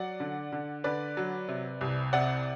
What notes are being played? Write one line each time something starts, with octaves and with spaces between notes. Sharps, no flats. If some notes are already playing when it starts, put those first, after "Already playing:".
Already playing: F#3 D5 F#5
D3
D3
D3 B4 D5
F#3
C3
C2
C3 D5 F#5